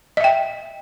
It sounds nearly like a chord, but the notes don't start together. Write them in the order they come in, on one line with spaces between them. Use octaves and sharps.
D#5 E5 G5